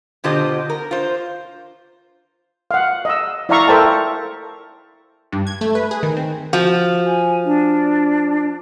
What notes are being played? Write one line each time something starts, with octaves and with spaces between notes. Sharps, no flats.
B2 D3 F4 G4 C5 D#5
A#4
F4 C5
F5 F#5
D#5 E6
E4 D5 E5 F5 A#5 C#6
A4 A#4 C5 E5 G5 A5
G2
G#6
A3
B4
G#4
D#3
C4
F3 F#4
G#5
D4